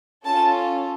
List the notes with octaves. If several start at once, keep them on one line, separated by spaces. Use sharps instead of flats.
C#4 F4 A4 A5